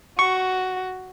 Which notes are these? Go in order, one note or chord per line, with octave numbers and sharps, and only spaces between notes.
F#4 C#6